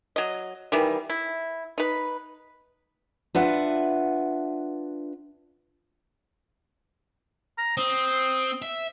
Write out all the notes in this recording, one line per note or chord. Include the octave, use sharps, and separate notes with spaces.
F#3 D#5
D#3 E3 G3
E4
D#4 B4
D4 F4 B4 E5 F#5
A#5
C4 D#6
E5